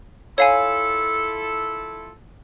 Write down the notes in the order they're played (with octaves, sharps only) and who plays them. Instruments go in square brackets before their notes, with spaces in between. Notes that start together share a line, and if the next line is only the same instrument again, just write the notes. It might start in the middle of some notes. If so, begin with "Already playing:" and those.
[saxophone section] E4 F4 A4 [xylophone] C#5 F5 G#5